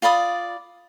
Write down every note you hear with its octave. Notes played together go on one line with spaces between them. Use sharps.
F4 D5 B5 D#6